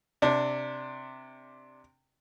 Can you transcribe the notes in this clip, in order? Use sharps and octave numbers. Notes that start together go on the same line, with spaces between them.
C3 D4